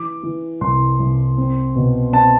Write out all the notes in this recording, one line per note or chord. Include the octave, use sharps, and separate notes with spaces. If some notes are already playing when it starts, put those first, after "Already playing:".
Already playing: E3 D6
E3
C2 C6
C2
C4
B2
C4 A5